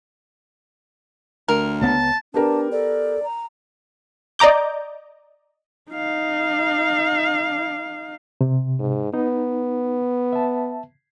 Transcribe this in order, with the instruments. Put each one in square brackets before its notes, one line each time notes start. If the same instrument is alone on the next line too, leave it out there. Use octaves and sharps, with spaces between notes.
[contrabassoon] D2 [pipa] A#4
[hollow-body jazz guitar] C#2 B3 A#5 [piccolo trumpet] A5
[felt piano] B3 G4 A#4 [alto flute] D4 [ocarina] A5
[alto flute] A4 [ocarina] D5
[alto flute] A#5
[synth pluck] D5 D#5 A#5 D6 G6
[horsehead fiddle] D#4 F5
[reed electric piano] C3
[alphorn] G#2
[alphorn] B3 [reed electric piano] D#4
[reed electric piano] E5 A5